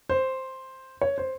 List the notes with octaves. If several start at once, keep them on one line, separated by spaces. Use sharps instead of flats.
C5
C#5
C5